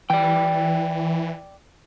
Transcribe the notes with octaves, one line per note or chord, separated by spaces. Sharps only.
E3 D5 G5